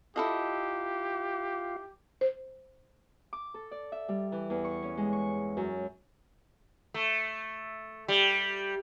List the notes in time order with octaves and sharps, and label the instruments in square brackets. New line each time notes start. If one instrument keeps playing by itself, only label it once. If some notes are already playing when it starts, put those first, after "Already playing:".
[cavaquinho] E4 A4 D#5 [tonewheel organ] F4 F5 [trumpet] G4
[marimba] C5
[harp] D6
A4
D5
E5
G3
E3
E2
C#6
C#4
G#3
C#6
F#2
[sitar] A3
G3